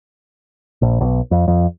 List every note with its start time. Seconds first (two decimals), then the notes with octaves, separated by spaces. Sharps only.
0.82 A#1
1.01 B1
1.31 F2
1.48 F2